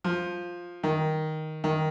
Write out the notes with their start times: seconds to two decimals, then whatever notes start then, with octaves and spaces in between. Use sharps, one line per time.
0.04 F3
0.83 D#3
1.64 D#3